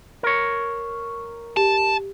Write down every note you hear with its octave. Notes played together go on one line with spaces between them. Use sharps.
A#4 C#5
G4 A5